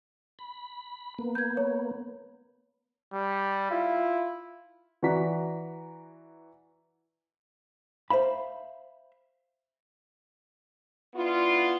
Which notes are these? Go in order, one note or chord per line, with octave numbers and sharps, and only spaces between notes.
B5
A#3 B3
G6 G#6
C#5
G3
E4 F4
E3 F#4 D5 A#5 B6
C5 E5 F5 B5
B3 D4 E4 F4